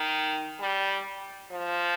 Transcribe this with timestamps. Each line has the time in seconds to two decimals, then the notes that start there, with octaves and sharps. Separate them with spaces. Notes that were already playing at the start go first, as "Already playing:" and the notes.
Already playing: D#3
0.60 G3
1.51 F3